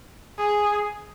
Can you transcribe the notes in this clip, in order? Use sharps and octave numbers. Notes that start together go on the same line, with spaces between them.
G#4